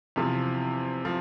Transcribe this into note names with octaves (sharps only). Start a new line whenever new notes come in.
E2 C3 F3
F3